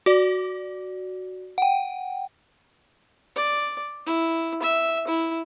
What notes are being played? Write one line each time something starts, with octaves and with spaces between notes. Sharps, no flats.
F#4 D5
F#5 G5
D5
E4
E5
E4